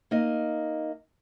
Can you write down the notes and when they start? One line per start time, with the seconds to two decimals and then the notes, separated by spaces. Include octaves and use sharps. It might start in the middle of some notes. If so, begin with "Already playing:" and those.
0.11 A#3 D#4 D#5